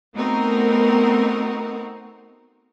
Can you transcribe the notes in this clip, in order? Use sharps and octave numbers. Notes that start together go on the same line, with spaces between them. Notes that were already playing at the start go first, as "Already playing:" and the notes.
A3 B3 C4 D#4 F#4 A#4